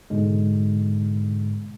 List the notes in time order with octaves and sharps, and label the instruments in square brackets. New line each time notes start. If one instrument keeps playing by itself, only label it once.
[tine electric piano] G#2 B2 D3 G#3